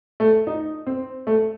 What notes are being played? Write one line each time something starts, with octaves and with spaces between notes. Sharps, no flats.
A3
D#4
C4
A3